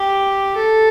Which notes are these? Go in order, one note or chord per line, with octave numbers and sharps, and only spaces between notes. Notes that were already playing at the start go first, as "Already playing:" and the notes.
Already playing: G4
A4